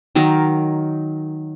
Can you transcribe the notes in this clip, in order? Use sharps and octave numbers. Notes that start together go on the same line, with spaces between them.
D#3 F#3 A#4